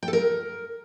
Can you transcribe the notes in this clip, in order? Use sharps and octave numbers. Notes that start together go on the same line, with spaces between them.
G5
A4
A#4